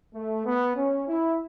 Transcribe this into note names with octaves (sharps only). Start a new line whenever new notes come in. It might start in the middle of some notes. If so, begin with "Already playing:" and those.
A3
B3
C#4
E4